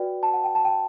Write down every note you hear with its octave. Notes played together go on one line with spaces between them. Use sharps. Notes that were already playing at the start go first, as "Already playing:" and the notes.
Already playing: F#4 B4 D5 G5
A5
F#5
G5
A5
G5